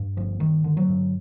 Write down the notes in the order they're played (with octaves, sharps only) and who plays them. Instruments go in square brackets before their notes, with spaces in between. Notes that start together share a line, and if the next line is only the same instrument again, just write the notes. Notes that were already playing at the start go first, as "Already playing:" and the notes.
Already playing: [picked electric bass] G2
G1 F3
G1 D#3
D3
F#3
G2